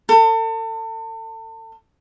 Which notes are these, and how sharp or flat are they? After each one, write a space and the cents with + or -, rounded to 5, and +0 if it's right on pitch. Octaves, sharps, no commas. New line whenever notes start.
A4 +35